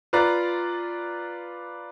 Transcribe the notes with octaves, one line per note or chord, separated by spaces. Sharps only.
F4 B4 D5 A#5